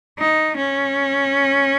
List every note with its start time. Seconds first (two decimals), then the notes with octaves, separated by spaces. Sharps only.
0.19 D#4
0.57 C#4